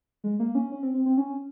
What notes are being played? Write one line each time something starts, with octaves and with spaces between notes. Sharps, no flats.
G#3
A#3
C#4
C#4
C4
C4
C4
C#4